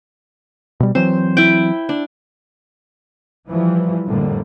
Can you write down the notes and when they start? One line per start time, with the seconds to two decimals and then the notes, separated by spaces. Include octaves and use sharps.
0.80 B2 G3
0.95 E3 F#3 C4 C5
1.37 E4 G5
1.89 D4
3.50 E3 F3 G3
4.06 F2 A2 D3 G3 A#3